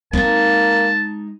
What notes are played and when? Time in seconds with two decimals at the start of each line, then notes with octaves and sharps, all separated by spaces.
0.13 G#3 A#3 C4 D#4 A5